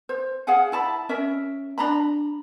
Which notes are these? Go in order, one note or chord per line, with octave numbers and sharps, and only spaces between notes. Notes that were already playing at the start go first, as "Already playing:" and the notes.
C5
G#4 F5 F#5 G#5
E4 A5 B5
C#4 A#4 E5
D4 A#5 B5